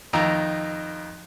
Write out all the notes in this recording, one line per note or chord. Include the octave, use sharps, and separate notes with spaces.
F2 D#3 A#5 E6